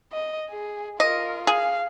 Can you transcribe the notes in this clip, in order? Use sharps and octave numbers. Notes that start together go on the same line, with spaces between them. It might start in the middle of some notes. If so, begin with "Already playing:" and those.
D#5
G#4
F4 A#4 D#5
G#4 F5